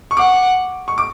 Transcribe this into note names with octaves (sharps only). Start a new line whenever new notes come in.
C#6
F#5 D6
C#6
D6